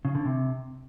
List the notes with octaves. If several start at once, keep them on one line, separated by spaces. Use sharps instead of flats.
C#3
D3
C3